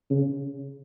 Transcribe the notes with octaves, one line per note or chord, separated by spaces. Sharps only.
C#3